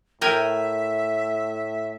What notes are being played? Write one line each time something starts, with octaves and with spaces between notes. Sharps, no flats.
A2 A#4 E5 G5 G#5